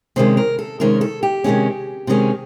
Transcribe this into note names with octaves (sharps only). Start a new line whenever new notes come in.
C3 D#3 G#3 C#4 C5
A#4
A4
C3 D#3 G#3 C#4 A#4
A4
G4
C3 D#3 G#3 C#4
C3 D#3 G#3 C#4